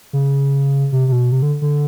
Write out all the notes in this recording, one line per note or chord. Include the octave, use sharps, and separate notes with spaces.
C#3
C3
C3
B2
C3
D3
D3